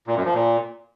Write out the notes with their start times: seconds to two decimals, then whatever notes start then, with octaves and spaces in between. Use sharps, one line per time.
0.07 A#2
0.16 F#2
0.25 F3
0.34 A#2